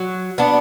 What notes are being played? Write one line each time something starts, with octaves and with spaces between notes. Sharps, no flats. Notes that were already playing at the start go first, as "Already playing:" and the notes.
Already playing: F#3
B3 D4